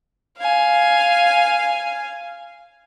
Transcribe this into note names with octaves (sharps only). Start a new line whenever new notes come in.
F5 G#5